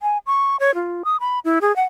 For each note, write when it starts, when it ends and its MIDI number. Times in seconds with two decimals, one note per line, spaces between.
0.02 0.18 80
0.26 0.56 85
0.60 0.74 73
0.74 1.02 65
1.04 1.17 87
1.20 1.39 83
1.44 1.59 64
1.61 1.74 68
1.76 1.84 78